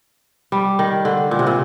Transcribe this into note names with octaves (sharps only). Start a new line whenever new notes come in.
G3
D#3
D3
A#2
C3
A#2